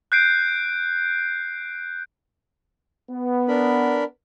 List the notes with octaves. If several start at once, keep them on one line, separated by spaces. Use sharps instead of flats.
F#6 G6 C7 D7
B3
D4 A#4 B5